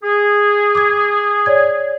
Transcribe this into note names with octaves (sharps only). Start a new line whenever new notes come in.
G#4
D6 D#6 G#6
C#5 D5 G#6